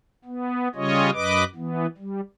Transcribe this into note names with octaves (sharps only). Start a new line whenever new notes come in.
B3
C#3 G3 C#4 F4 C#5 D#5
F#2 B4 D#5 D6
E3 B3
G3